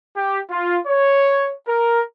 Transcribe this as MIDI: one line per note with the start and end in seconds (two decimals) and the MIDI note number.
0.17 0.40 67
0.50 0.78 65
0.86 1.53 73
1.68 2.01 70